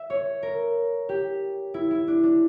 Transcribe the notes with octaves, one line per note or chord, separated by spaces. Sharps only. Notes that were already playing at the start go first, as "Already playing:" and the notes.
Already playing: E5
C#5
A#4
G4
E4
E4
D4
D4